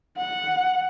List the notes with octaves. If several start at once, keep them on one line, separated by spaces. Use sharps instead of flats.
F#5